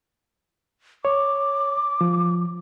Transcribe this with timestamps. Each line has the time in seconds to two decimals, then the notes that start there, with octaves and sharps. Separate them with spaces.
1.05 C#5 D6
2.01 F3